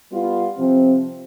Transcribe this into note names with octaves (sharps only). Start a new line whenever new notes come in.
G3 B3 F4
C3 F3 C4